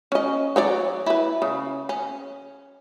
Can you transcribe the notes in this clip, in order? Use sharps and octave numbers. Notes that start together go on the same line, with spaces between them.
C#4 D#5
F#3 C#5 D5
E4 B4
C#3
C#4